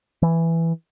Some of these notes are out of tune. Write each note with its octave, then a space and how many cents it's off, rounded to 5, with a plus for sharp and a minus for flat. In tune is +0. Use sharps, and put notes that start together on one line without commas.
E3 +5